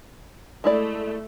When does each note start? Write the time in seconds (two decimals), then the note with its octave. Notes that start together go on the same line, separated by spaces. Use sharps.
0.64 G#3 A3 E4 D5